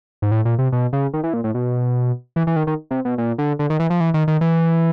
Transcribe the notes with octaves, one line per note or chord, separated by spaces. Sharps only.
G#2
A2
A#2
C3
B2
C#3
D#3
E3
A#2
A2
B2
E3
E3
D#3
D#3
C3
B2
A#2
D3
D3
D#3
E3
F3
E3
D#3
D#3
E3